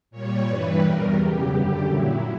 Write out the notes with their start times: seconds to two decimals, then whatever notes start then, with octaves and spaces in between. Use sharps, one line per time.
0.11 A#2 G3 C#5
0.47 G2 E3 G3 B4
0.81 E2 B2 G3 A#4
1.16 E2 C#3 F#3 G4
1.50 F#2 D3 G3
1.86 A#2 F#3 E4